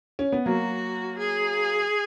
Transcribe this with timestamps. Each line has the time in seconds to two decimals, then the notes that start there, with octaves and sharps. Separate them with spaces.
0.19 C#4
0.32 B3
0.46 F#3 A#3 F#4
1.19 G#4